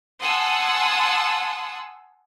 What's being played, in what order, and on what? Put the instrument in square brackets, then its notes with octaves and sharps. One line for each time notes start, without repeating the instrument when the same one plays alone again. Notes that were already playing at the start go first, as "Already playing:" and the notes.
[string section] F#5 G#5 A5 C6 D#6 E6